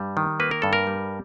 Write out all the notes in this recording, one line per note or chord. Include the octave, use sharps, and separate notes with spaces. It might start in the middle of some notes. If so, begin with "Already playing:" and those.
Already playing: G2 G3
D#3
A#3 B4
A#4
G2 A4
A#4
G3